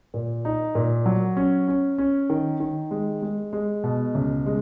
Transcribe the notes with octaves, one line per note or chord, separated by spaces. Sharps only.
A#2
D#4
A#2
F#3
C#4
C#4
C#4
D#3
D#3
G#3
G#3
G#3
B2
C#2
G#3